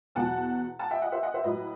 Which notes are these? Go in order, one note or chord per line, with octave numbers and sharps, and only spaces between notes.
E2 B2 F#3 F#5 A5
F#5 A5
E5 G5
D#5 F#5
C5 E5
D#5 F#5
C5 E5
A2 F#3 B4 D#5